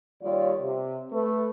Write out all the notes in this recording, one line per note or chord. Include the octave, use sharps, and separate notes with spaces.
D#2 G3 F4 C#5 D5
C3
A3 B4